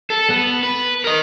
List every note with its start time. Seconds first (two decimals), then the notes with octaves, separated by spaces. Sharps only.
0.10 A4
0.30 B3
0.63 B4
1.04 A#4 D#5